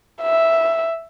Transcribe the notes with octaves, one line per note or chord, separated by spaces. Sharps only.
E5